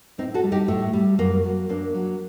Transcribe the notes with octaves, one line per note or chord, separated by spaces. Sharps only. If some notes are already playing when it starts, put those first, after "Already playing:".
A2 C4 D#4
F#4 A4
G3
D#4 G4
A2 A3
G3
F#2 A#3
F#3
F#2 A#3 D4
F#3